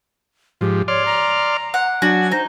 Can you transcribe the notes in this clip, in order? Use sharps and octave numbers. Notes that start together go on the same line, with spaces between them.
G#2 F3 G4
C#5 D5 C6 F6
A#5
F#5
F#3 D4 F#4 G#5
D#4 C5